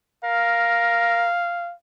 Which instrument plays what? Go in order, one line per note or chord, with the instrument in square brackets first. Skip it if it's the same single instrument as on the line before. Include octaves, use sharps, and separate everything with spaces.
[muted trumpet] A#4 [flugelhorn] F5